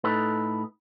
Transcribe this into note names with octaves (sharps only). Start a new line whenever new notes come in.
A2 D#4 A4 B4